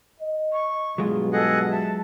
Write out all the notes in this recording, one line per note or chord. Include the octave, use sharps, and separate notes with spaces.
D#5
C#6
G2 B2 F#3 G#3 F4
G#4 A4 D#5 F#5
E5 A5